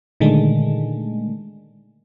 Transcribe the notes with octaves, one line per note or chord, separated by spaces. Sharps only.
A#2 D3 D#3 G#3 A3